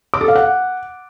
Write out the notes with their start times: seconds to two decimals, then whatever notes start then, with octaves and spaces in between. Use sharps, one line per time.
0.14 D6
0.21 A4
0.28 F5
0.36 F#5